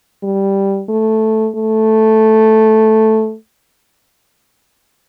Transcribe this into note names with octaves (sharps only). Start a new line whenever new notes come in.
G3
A3
A3